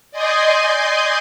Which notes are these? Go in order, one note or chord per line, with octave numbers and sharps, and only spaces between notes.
D5 D#5 G#5 C6 D#6 G6